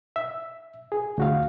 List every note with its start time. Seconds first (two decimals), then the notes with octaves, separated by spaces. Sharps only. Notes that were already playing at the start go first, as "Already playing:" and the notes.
0.16 E5
0.92 G#4
1.18 D2 F#4 F5